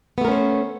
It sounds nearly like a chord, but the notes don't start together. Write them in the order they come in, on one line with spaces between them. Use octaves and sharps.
B3 A3 A#4 C#4 C5